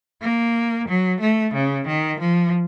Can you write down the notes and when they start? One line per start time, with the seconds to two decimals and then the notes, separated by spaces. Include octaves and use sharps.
0.22 A#3
0.88 F#3
1.21 A3
1.54 C#3
1.87 D#3
2.20 F3